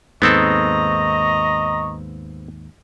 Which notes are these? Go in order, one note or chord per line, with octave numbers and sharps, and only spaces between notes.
D#2 G#2 B3 C4 A4 D#5 A#5 C#6